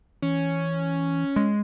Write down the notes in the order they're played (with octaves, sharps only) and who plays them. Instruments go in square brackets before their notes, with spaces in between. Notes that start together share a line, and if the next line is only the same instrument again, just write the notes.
[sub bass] E3 [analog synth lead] C#4
[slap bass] G#3